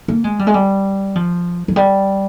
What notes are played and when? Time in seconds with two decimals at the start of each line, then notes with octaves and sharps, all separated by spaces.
0.08 A#3
0.24 G#3
0.39 G3
0.47 G#3
0.54 G3
1.15 F3
1.68 F3
1.76 G3